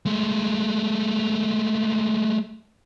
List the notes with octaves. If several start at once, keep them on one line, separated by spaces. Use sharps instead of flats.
G#3 A3